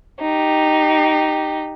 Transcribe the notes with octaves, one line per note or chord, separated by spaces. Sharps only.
D#4 G4